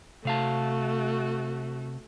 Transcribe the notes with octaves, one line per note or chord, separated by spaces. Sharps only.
C3 A3 F#4 F5 A5